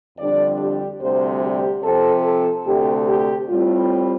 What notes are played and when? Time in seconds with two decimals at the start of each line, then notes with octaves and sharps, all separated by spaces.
0.18 F2 D3 G3 D4 D5
0.59 G4
1.01 D2 C3 G3 C5
1.42 G4
1.83 C3 F3 C4 A4
2.25 A4
2.66 D2 C3 A3 G4
3.08 G4
3.49 A2 G3 C4 F4